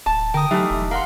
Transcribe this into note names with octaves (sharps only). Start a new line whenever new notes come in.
D1 A5
D3 A#4 G5 D#6
E3 F#3 A3 D#4 G4 E5
E1
A#4 F5 F#5 C6